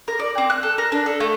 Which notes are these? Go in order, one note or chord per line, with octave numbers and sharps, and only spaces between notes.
A#4
D5
C4
F#6
A4
A#4
D4
A4
A3